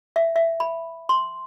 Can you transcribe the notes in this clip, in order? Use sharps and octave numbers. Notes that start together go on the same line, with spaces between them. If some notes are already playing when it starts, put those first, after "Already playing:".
E5
E5
B5
C6